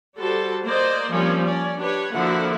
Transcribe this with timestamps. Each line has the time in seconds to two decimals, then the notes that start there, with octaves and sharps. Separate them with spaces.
0.16 G3 F#4 A4 C5 A5
0.64 A#3 C5 D5 D#5
1.11 F3 G3 A#3 C4 C#4
1.45 C#4 D5
1.79 D4 G4 B4 C#5
2.12 D3 F3 A#3 E4 F#4 F#5